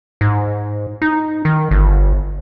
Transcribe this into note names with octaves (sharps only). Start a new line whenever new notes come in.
G#2
D#4
D#3
G1